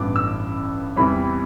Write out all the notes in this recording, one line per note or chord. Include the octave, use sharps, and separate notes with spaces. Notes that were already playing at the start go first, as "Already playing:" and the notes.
Already playing: A1 G2 E3 B3 D6
E6
E2 C3 E3 G3 B5